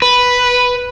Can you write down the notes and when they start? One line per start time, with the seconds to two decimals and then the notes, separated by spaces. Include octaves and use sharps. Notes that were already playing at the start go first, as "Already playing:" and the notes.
0.02 B4